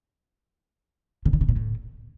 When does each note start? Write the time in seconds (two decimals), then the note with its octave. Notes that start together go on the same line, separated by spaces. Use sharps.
1.25 C#3
1.33 D3
1.41 C3
1.49 A#2
1.56 A2